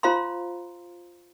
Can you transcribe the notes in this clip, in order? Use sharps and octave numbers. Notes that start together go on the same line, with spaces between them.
F4 C5 F5 A#5 C6